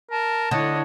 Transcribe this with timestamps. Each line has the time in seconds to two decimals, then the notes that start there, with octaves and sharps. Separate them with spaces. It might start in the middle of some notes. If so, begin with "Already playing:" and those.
0.11 A#4 A5
0.51 D3 E4 C#5 D#5